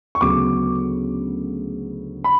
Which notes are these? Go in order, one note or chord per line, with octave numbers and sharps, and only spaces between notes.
C#6
D2 C#3 F#3 B3 D6
B5